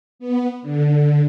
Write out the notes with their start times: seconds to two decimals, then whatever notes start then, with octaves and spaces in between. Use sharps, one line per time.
0.19 B3
0.62 D3